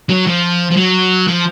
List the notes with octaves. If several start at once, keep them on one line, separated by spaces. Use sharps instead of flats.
F#3
F3
F3
F#3
F3